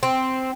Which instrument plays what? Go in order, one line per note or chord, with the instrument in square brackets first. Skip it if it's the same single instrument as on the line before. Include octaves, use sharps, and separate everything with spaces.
[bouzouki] C4